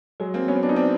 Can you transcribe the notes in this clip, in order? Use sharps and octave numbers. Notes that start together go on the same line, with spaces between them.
F#3 G#3
A#3 C4
B3 C#4
D4
D#4
C4 D4